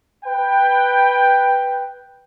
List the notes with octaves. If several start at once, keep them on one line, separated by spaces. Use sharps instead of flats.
B4 G5